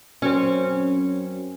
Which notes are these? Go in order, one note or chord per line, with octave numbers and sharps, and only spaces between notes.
F#2 C4 C#4